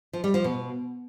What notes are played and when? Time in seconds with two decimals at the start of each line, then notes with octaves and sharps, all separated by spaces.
0.13 F3
0.24 G3
0.34 F3
0.44 B2